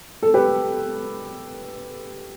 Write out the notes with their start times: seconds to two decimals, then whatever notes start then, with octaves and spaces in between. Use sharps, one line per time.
0.23 A4
0.34 G4 B4